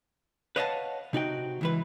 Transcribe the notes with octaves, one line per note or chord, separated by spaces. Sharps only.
B4 C#5 D#5 F5 F#5 A5
C3 D#4 F#4 G5
C#2 E3 B4